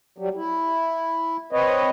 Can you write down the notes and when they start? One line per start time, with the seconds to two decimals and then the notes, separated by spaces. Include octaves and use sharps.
0.18 F#3 G3
0.36 E4
1.52 C4 B4 C#5 D#5